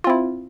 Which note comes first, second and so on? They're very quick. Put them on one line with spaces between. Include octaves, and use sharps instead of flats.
F4 C4 E4